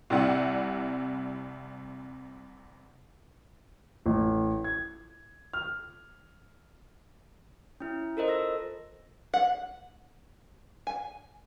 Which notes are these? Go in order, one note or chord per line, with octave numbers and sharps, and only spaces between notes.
C2 C3 E4 D5 F#5
A1
G#6
F6
C#4 E4
F4 A4 A#4 C5 D#5
E6 A#6
F#5
G#5